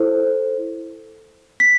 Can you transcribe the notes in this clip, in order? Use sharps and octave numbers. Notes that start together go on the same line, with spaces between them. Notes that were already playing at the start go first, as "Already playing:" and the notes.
Already playing: E4 A4 C5
B6